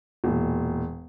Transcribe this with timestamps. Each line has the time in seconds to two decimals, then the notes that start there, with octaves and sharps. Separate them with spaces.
0.24 E1 A#2